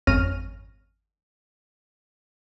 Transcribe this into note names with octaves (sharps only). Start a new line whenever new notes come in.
G#1 F2 C#4 F6 A#6 D#7